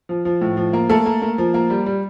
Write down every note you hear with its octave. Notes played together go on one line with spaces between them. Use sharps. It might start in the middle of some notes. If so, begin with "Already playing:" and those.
F3
F3
A2
F3
A#3
A3 A#3 A4
A#3
A#3
F3
A#3
G3
G3